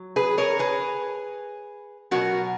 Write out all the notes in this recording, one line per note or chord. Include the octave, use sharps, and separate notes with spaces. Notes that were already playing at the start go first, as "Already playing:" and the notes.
Already playing: F#3
G#4 B4
A#4 C#5
G#4 B4
B2 F#3 F#4 A#4